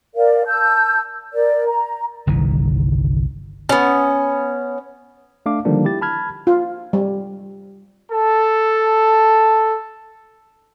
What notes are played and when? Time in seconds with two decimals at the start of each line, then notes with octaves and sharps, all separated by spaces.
0.15 A#4 D5 F5
0.46 A5 E6 G6
1.33 A#4 D5
1.68 A#5
2.27 G1 C2 D#3 E3
3.69 B3 C#4
5.46 A3 D4 F5 D6
5.65 D3 D#3 F3 G3 A#3 D4
5.84 E4 G4 A6
6.01 A5 B5 F6 G#6
6.47 F4
6.93 G3
8.10 A4 A5